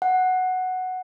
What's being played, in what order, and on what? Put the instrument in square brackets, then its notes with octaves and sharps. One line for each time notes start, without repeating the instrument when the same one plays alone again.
[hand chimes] F#5